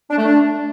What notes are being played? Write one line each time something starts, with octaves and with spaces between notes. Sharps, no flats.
D4
A3
D4